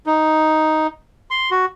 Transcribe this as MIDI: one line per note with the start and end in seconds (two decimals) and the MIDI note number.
0.06 0.87 63
1.31 1.50 84
1.51 1.66 66